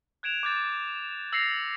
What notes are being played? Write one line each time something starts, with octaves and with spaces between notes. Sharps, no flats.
F#6 G#6 D7 E7 F7
D6 G6 A6
E6 A6 A#6 C7 C#7 F7